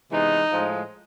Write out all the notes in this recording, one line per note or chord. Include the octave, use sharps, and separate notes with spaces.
C3 E3 G#3 B3 D#4
A2 F3 G#3